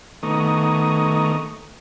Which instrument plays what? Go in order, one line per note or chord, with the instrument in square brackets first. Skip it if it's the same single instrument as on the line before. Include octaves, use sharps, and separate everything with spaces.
[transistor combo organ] D#3 A3 B3 A#5 C#6 D#6